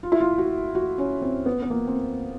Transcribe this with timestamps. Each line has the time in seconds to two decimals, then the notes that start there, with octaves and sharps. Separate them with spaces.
0.03 F4
0.12 E4
0.20 F4
0.38 F#4
0.75 F#4
0.98 C#4
1.22 C4
1.46 B3
1.62 B3
1.70 A#3
1.87 C4